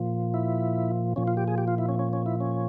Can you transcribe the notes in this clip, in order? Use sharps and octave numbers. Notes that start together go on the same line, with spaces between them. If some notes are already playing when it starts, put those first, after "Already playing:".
Already playing: A#2 F3
E4
A#2 F3 C#4
F4
G4
G#4
G4
F4
E4
C#4
C#4
C#4
E4
C#4